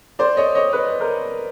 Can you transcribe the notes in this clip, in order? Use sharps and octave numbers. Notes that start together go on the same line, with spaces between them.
C5 D5
C#5 D#5
C#5 D#5
B4 C#5
A#4 C5